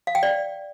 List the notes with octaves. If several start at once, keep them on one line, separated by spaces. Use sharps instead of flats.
F5
G5
D5